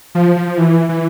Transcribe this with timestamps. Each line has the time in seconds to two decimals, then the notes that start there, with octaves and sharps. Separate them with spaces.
0.15 F3
0.36 F3
0.58 E3
0.89 E3